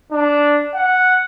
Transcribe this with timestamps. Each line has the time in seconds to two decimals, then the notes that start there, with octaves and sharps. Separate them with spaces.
0.12 D4
0.75 F#5